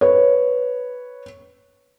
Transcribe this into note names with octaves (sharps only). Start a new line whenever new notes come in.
B4 C#5